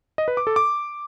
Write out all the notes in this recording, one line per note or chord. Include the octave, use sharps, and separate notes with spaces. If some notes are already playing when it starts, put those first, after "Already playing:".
D#5
B4
D6
A4
D6